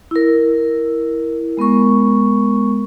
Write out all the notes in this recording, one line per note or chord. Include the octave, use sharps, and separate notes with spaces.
E4 A#4
G#3 B3 A#4 C#6